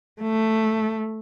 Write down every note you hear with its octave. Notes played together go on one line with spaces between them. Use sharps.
A3